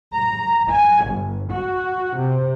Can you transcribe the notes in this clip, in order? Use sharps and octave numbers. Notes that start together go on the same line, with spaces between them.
A#5
G#5
G1
F#4
C3